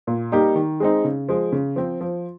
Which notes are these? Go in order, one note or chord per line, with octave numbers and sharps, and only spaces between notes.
A#2
G3 A#3 D#4 G4
D#3
G#3 C4 D#4
C#3
F3 G#3
C#3
F3 C4
F3